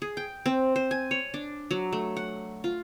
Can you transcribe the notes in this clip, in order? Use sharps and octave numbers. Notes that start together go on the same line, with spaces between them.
G#4
G5
C4
C5
G#5
C#5
D4
F#3
A3
F#5
F4